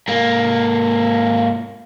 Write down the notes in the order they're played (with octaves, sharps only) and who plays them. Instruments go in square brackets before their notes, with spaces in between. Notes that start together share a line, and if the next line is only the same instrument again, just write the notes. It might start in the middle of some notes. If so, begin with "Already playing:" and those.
[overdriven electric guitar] G#2 A#3